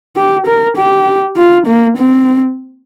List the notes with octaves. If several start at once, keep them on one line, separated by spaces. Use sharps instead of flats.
G4
A#4
G4
F4
A#3
C4